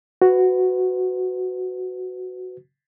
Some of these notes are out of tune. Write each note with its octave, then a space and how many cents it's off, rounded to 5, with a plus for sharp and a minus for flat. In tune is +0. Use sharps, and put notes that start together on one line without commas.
F#4 +0 B4 +25